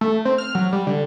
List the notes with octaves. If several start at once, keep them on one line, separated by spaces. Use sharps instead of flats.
A3
C4
F6
F#3
G3
D3